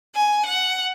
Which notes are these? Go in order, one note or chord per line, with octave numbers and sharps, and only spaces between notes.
G#5
F#5